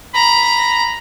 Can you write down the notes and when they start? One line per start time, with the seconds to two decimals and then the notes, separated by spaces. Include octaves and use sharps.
0.14 A#5 B5